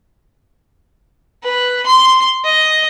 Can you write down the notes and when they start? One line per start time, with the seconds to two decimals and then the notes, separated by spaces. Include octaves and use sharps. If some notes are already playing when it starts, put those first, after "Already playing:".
1.43 B4
1.86 C6
2.45 D#5